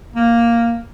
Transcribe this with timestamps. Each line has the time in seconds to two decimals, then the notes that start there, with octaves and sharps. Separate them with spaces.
0.16 A#3